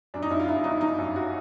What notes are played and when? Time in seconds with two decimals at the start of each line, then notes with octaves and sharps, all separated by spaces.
0.14 F#2 D4
0.22 D#4
0.30 F#2 E4
0.40 F4
0.48 G1 E4
0.64 G1 D#4
0.81 G1 D#4
0.99 F#2
1.16 F#4